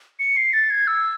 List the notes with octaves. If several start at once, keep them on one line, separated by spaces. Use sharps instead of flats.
C#7
C7
A6
G#6
E6